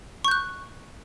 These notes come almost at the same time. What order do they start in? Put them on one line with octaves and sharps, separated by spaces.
C#6 G6 F#6